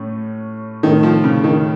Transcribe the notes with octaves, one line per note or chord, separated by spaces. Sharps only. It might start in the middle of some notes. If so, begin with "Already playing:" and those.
Already playing: A2 A3 C#4
A2 D#3 A3 C#4
F3
C#3
D#3